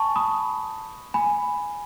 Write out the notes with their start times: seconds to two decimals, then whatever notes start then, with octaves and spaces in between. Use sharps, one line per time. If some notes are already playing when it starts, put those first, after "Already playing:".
Already playing: G#5 A5 B5 C#6
0.16 B5 D#6
1.14 G#5 B5